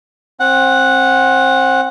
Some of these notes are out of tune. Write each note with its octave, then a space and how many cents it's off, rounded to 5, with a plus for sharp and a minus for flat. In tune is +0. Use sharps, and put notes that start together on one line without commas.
C4 +25 F#5 -5